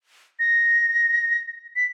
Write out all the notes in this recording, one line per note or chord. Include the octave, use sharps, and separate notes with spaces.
A#6
B6